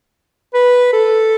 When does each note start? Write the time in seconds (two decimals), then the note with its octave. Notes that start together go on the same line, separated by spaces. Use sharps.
0.54 B4
0.93 A4